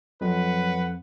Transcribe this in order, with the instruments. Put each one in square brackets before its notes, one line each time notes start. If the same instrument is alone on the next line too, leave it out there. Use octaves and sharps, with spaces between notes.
[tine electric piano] F2 [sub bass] F#3 [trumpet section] B4 F#5